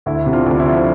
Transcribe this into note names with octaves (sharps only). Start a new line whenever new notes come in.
D2 E4
C3
D4 F4
D2 D4
E4
F3